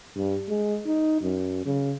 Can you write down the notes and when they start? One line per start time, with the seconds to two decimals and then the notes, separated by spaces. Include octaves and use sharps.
0.16 G2
0.49 G#3
0.86 D#4
1.22 F#2
1.66 C#3